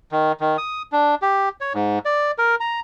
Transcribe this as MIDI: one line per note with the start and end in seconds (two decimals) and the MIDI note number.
0.12 0.32 51
0.40 0.57 51
0.58 0.82 87
0.92 1.15 62
1.22 1.49 67
1.61 1.73 73
1.74 1.99 44
2.05 2.31 74
2.38 2.55 70
2.60 2.80 82